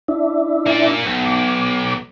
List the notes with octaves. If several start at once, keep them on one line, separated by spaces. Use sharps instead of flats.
D4 E4
A#3 D5
B1
D6